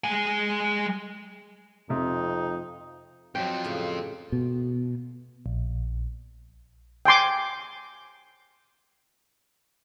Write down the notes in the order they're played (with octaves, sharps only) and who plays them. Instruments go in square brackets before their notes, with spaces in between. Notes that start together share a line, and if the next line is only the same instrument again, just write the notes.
[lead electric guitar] G#3 G#5
[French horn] F2 [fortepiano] C3 [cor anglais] D#4
[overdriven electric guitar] F2 F3 [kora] F#3 G5
[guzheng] A2 C#3
[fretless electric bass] B2
[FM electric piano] A#1
[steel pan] G5 G#5 C6 D6